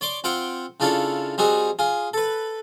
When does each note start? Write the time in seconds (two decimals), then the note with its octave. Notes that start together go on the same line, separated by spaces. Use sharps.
0.01 C#5 D5 C6 D6
0.24 C4 F4 F#5 G5
0.80 C#3 D4 E4 F4 A4 C#5
1.38 G3 C4 D#4 F#4 G#4
1.79 F4 G#4
2.14 A4 B4